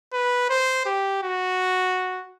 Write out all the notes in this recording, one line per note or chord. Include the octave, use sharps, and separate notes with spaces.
B4
C5
G4
F#4